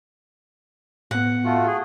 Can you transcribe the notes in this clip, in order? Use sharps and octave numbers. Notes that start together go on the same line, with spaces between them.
A2 B3 F#5
A3 F4 F#4
G#4